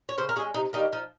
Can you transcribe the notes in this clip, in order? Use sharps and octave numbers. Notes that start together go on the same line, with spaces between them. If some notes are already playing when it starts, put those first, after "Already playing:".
C#5
C#3 C5
A#4
G#3 C#4 G#4
C3 D#4
D#3 G3 A#3 D#4
F3 D#4